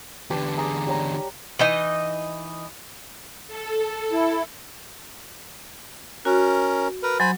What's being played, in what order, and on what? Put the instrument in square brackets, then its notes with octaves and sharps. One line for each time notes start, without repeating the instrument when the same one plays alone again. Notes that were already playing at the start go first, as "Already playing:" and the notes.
[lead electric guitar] E2 D3 [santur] G4 B4 A5
[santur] G#4 A#5 D6
G3 C#5 A#5
G4
[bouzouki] E3 D#4 D#5
[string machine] A4
[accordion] E4
[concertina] C#4 A#4 [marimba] F#4
[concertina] A#4 B4
[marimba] F#3 [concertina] C5 G#5 B5